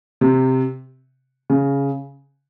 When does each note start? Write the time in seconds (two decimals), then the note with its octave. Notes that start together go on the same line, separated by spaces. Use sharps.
0.21 C3
1.50 C#3